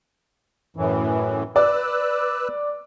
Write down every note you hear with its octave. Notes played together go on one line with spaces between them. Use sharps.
F#2 A2 E3
B4 D5 E6 F#6